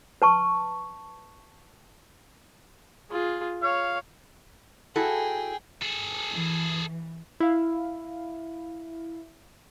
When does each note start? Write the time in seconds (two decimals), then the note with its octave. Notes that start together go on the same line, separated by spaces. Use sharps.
0.22 B4 A5 C#6
3.11 F4 G#4
3.62 C#5 F5
4.96 E4 F#4 G#4 A4 G5
5.82 G#4 A4
6.31 E3
7.40 E4 F5